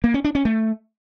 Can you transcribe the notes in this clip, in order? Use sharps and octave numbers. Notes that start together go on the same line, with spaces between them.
A#3
C#4
D4
C#4
A3